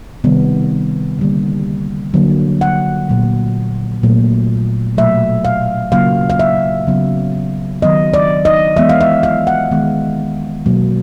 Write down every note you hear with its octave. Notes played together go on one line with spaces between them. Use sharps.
C3 D#3 G3 B3
D3 G3 A#3
D3 F#3 A#3
F#5
A#2 F#3 A3
A#2 F#3 A3
B2 F#3 A3 E5
F5
C#3 F#3 A#3 F5
F5
E5
C#3 F#3 B3
D#3 F#3 B3 D#5
D5
D#5
E3 G#3 B3 E5
F5
E5
F5
F#5
D#3 G#3 B3
B2 F#3 A#3